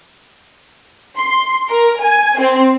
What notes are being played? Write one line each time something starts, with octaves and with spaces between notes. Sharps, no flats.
C6
A#4
G#5
C4